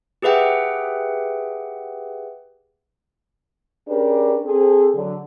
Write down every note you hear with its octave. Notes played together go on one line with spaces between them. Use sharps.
G4 G#4 B4 E5 F#5 G5
C#4 D4 G4 G#4 A#4 B4
C4 G#4 A4
D3 F#3